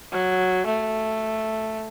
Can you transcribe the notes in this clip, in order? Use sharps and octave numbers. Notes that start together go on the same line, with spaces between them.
F#3
A3